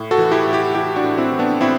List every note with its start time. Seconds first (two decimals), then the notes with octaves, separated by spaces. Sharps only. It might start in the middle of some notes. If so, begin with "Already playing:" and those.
Already playing: A2
0.11 F#4 A4
0.18 E3
0.32 E4 G4
0.46 A2
0.53 E4 G4
0.75 E3 E4 G4
0.96 D4 F#4
1.04 A2
1.18 C4 E4
1.32 E3
1.39 B3 D4
1.61 A2 C4 E4